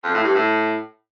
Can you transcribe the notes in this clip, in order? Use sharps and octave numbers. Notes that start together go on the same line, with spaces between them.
F2
A2
G2
A2